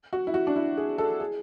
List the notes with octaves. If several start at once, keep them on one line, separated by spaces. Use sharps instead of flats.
F#4
E4
F#4
D4
E4
G#4
A4
G#4